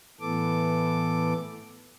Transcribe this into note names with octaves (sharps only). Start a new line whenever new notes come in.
A2 E3 B3 A4 D6